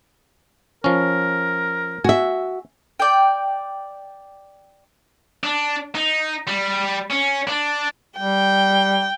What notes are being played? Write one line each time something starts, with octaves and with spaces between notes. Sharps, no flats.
F3 C#4 A#4
F#4 E5 G#5
D5 G5
D4
D#4
G3
C#4
D4
G3 G5